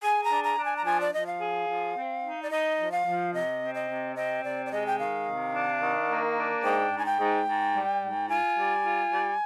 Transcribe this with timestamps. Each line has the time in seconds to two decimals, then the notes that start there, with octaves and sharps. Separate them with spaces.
0.02 G#4 G#5
0.24 A#5
0.30 D4
0.44 A#5
0.58 D4
0.65 G#5
0.77 A#5
0.85 F3 G#5
1.01 D5
1.12 F3 D#5
1.26 F5
1.40 G#4
1.67 F3
1.96 C4
2.22 D#4
2.43 D5
2.50 D#4 D#5
2.78 F3
2.92 F5
3.05 F3
3.34 C3 D#5
3.61 C4
3.75 D#5
3.89 C3
4.16 C4 D#5
4.44 C3 D5
4.66 D5
4.71 G#3 D#5
4.87 G5
4.99 D#3 F5
5.27 C3
5.53 D4
5.81 D#3
6.09 A#3
6.36 D4
6.64 G#2 G5
6.91 G#2
6.98 G#5
7.06 G5
7.19 G#2
7.46 G#2
7.75 G3
8.02 G#2
8.29 F4 G#5
8.57 G3
8.85 F4
9.12 G3